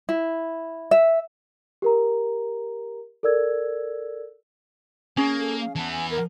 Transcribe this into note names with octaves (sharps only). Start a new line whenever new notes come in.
E4
E5
G4 A#4 A#5
A4 A#4 D5 E6 G#6
A#3 C#4 G#4
A4
F5
E3 B3 A5
G#5
A#4